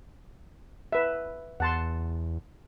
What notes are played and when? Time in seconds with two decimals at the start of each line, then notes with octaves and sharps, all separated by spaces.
0.92 B4 E5
1.60 E2 F#5 A5 C6